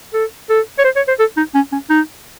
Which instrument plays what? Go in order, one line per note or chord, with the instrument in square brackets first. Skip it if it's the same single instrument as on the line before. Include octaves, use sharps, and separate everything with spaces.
[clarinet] A4
A4
C#5
C5
C#5
C5
A4
D#4
C#4
C#4
D#4